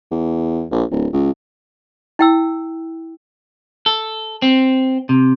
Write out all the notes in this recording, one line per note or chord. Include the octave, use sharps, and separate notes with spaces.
E2
A#1
D1
C#2
E4 G5 E6
A4
C4
C3